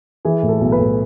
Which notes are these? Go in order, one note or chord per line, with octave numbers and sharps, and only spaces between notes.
E3 G#4
A2
A4
B1
B4
A2